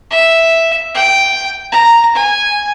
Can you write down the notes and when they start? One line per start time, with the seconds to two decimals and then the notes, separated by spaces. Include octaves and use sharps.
0.10 E5
0.94 G5
1.72 A#5
2.15 G#5